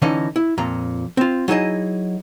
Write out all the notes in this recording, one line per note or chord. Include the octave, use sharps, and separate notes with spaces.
D3 E3 C#4 D#4
E4
F2 A#2 A#5
C4 F4
F#3 D#4 E4 G#4 D#5